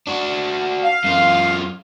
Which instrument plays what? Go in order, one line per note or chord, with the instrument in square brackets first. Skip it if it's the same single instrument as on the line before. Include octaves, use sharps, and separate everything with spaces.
[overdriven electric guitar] D4 F#4
[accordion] F5
[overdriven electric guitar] F#2 F4